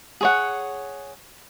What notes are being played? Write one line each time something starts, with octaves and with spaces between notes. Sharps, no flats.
G#4 C#5 F#5